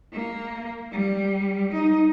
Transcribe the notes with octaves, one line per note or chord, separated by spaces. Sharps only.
A#3
G3
D#4